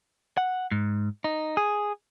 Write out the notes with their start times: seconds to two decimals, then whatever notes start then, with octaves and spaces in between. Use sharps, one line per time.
0.37 F#5
0.71 G#2
1.24 D#4
1.57 G#4